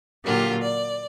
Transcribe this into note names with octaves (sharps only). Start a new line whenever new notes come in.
A#2 D3 F#3 A#3 F4 G4
D5